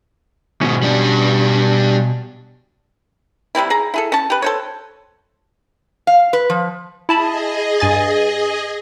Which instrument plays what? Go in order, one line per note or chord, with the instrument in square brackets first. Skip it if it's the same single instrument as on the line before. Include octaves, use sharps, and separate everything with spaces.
[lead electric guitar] G#2 D#3 [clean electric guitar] B2 C#4
[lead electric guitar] G3 D4
[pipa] C3 G3 C4 E4
G#4 A#5
E4 G#4 A4
C#4 A5
G4 B4
A4 C5 C#5
[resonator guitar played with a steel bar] F5
B4
F3
[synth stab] E4 A5 B5 [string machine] G#4 D#5
[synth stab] G2 G#5 A6